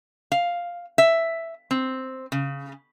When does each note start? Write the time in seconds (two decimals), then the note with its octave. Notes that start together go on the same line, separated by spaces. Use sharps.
0.32 F5
0.98 E5
1.71 C4
2.32 C#3